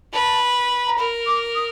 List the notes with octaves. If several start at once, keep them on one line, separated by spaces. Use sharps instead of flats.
B4 A5
A#5
A#4 B5
D6
D#6